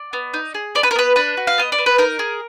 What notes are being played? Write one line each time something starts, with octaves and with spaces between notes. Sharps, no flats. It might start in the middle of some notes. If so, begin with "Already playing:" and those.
Already playing: D5
B3
D#4
G#4
B3 D5
B4
A#4
B3 B4
D4 B4
F#4
F5
B3 D#5
D5
B3
B4
D#4 A#4
G#4